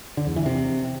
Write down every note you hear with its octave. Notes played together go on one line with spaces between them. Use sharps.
D3
E2
E3
C3